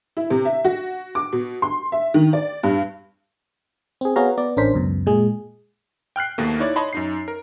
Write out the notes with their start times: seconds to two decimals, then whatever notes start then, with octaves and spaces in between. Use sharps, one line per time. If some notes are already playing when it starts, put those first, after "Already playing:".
0.17 E4
0.30 C3
0.45 E5
0.65 F#4
1.15 D6
1.33 B2
1.62 C6
1.92 E5
2.14 D#3
2.33 D5
2.63 G2
4.01 C4 G#4
4.16 B3 F#4 G#4 C#5 F5 A#5
4.38 B3 D5
4.57 A1 C#4 D4 A#4 C5 B6
4.74 C#2 F#2 B2
5.06 A#2 G#3 G#4
6.16 G5 F6 F#6 C7
6.38 D#2 B2 A3 A#3
6.59 D#4 E4 C#5 D5
6.76 C#5 D#5 A5 B5 C6
6.93 F#2 D#4 C7
7.28 A#4